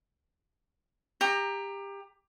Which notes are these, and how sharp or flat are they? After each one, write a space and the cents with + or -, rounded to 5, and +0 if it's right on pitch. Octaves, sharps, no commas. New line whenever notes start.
G4 +25 A#5 +0